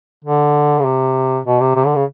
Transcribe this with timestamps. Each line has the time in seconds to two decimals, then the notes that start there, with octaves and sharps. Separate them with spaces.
0.25 D3
0.79 C#3
0.85 C3
1.46 B2
1.60 C3
1.75 C3
1.86 D3
1.95 C#3